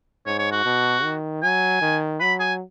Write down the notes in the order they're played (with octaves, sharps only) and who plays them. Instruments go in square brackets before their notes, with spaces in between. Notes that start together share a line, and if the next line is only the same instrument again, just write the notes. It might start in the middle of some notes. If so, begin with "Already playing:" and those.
[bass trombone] G#2 [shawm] C#5
[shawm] C#5
F#4
[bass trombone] B2
D#3
[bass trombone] F#3 [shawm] G#5
[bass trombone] D#3
[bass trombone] F#3 [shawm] B5
[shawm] G#5